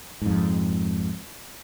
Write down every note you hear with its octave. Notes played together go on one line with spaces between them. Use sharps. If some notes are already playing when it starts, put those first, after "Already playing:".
F2 G#2